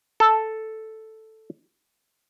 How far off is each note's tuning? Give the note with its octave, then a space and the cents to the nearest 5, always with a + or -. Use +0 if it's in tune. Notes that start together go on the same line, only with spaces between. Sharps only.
A4 +0